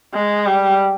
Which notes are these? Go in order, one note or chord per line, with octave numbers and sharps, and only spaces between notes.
G#3
G3